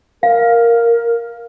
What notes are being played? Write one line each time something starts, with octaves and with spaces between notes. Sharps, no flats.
A#4 F5